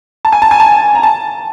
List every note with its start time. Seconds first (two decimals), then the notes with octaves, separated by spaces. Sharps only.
0.25 A5
0.32 G#5
0.42 A5
0.51 G#5
0.60 A5
0.95 A#5
1.03 A5